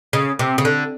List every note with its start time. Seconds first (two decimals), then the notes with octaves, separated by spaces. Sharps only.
0.13 C#3
0.39 C3
0.58 C#3
0.65 D3